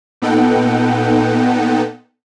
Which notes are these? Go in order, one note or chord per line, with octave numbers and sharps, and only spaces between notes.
A#2 B3 D#4 A4 F#5 G5